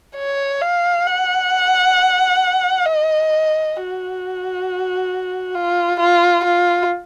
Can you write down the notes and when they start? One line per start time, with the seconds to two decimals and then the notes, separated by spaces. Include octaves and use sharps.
0.17 C#5
0.62 F5
1.07 F#5
2.87 D#5
3.76 F#4
5.55 F4
6.00 F4
6.44 F4